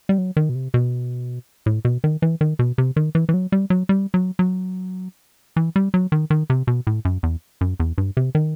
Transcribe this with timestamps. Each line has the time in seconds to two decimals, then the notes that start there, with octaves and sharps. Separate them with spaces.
0.09 G3
0.18 F#3
0.37 D#3
0.49 B2
0.55 C3
0.74 B2
1.66 A2
1.85 B2
2.04 D#3
2.22 E3
2.41 D#3
2.59 B2
2.78 C3
2.96 D#3
3.15 E3
3.29 E3
3.34 F#3
3.52 G3
3.70 F#3
3.89 G3
4.14 F#3
4.39 F#3
5.56 E3
5.76 G3
5.94 F#3
6.12 D#3
6.30 D#3
6.50 C3
6.67 B2
6.87 A2
7.05 F#2
7.23 E2
7.61 F#2
7.80 E2
7.98 G2
8.17 C3
8.35 D#3